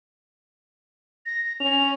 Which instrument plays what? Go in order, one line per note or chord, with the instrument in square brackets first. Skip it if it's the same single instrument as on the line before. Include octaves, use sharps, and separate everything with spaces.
[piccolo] A#6
[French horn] C#4 [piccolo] F7